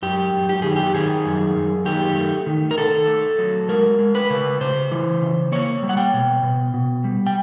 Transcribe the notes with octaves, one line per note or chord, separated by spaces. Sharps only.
F#2 G4
F#2
G4
D#3 G#4
G4
D#3 G#4
F#2
F#2
D#3 G4
A3
D#3
A#4
D#3 A4
A3
F#3
G#3 A#4
G#3
B4
C#3
C#3 C5
E3
C#3
A#3 C#5
G3
F#5
G5
B2
B2
B2
G3
G5